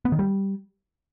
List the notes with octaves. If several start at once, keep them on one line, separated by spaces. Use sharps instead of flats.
B3
D#3
G3